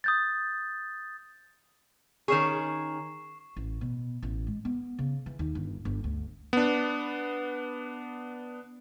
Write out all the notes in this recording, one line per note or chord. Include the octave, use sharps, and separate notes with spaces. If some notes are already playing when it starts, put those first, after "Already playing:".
D#6 G6 A6
D#3 C#4 G#4 C#6 C7 E7
A1
B2
A1
G#3
B3
C#3
E3
D#2
G1
G1
D2
B3 D4